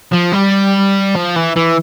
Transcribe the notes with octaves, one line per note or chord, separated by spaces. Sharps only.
F3
G3
F3
E3
E3